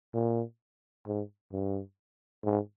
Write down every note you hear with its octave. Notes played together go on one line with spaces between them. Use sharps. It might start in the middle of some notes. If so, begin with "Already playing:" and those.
A#2
G#2
G2
G#2